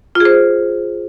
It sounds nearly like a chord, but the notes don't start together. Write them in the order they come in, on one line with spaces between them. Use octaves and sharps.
F4 G#4 C5